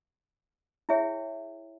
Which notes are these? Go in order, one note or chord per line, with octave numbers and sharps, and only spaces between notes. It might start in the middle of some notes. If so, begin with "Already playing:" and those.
E4 G#4 C#5 E5 G5